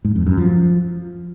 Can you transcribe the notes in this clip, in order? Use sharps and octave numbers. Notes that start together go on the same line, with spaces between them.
G#2
F2
F#2
F3